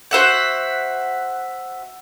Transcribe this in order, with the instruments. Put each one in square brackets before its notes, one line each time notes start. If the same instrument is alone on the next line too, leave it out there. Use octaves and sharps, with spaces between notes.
[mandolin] F#4 C5 E5 F#5